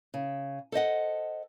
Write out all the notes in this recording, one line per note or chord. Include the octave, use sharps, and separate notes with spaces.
C#3
A4 C5 D#5 F#5